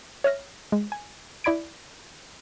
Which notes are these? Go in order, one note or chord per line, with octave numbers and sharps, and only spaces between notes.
C#5 E5 F6 A#6
G#3
G#5
E4 D5 B5 G#6 D7